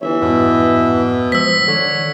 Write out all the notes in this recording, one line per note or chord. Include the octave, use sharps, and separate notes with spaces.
G1 E3 C#5 E5
F2 G#2 B2
F3 G#3 C5 E6 B6
D3 D#3 C#5